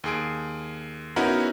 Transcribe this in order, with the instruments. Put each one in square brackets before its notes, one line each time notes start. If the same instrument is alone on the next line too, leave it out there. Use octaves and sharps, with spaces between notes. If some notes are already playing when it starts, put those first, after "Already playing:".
[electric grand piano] D#2 G#4 D7
B3 C#4 D#4 E4 F#4 A#4